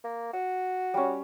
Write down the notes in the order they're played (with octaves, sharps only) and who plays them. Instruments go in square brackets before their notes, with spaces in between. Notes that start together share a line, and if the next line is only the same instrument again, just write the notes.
[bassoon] A#3
F#4
[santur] G3 C#4